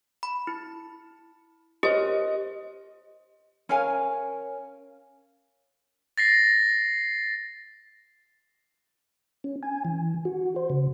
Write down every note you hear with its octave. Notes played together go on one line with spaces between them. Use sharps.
B5
E4
G4 C5 C#5 D#5
C#4 A#4 F5 G#5
A6 A#6 C7
C#4
G#5
E3
F#4
C5
C#3